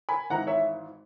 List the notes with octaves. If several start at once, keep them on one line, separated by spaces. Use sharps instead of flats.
G#5 B5
G#1 G#2 E3 F#5 A#5
C#5 E5